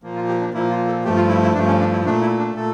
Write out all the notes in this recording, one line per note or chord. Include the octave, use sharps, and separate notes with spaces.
A#2 F3 A#3
F4
G4
D4
A#2 F3 A#3 E4
F4
A4
G2 F3 A3 G4
F4
E4
E4
G2 F3 A3 D4
C#4
D4
E4
A#2 A3 D4
E4
D4
A#2 A3 A4